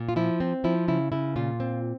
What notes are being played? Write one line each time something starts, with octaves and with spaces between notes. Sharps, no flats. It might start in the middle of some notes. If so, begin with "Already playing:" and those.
Already playing: A#2
F4
F3 E4
C4
F3 E4
C#3 E4
C#3 E4
A#2 F4
C4